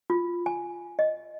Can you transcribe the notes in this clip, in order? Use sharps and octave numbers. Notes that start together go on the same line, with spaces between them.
F4
G#5
D#5